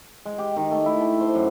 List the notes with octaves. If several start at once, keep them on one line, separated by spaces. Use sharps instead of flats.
G#3
G4
D#3
A3
E4
A5
C5
F#2